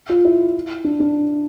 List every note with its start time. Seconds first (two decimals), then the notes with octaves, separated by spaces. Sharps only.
0.09 F4
0.25 E4
0.84 D4
1.00 D4